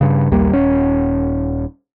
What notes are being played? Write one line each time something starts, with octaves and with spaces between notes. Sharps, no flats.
G2 C#3
A#1 D#2 G3 A#3
D#1 C#4